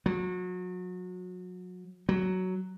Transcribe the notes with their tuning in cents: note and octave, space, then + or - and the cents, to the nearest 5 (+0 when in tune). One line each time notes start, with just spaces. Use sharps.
F#3 -30
F#3 +5